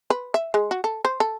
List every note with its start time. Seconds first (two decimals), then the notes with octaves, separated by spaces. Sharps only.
0.10 B4
0.34 E5
0.54 G#3
0.71 F#4
0.84 A4
1.05 C5
1.20 A4